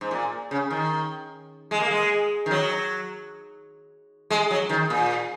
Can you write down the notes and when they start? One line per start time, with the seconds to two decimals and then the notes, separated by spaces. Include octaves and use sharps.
0.01 G#2
0.11 A#2
0.51 C#3
0.71 D#3
1.71 G#3
1.80 A#3
1.91 G#3
2.46 D#3
2.51 F#3
4.30 G#3
4.51 F#3
4.69 D#3
4.90 A#2